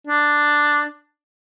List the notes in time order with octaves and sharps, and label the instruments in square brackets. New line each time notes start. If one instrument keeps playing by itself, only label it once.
[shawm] D4